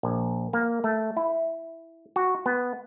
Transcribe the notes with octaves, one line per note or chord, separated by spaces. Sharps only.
A#1
A#3
A3
E4
F#4
B3